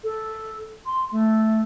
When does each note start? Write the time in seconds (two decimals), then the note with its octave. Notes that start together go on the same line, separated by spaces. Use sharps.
0.04 A4
0.86 C6
1.11 A3